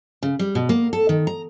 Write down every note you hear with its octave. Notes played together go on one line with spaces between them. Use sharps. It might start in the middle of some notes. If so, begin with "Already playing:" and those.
C#3
G3
B2
A#3
A4
D#3
A#5